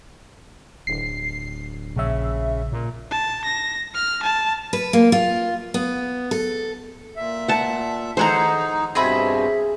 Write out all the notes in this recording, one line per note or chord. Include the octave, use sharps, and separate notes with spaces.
D1 C7
A#1 C#3 E5
A#2
A5
A#6
F6
A5
B4
A#3
F4
B3
A4
A#2 E5
F#5 A5
D#3 D#4 G#4 A4 C5 F#5 A#5
G2 B2 C4 G#4 D#5 E5 B5